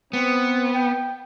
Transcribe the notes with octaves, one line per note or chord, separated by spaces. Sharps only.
B3 C4
G5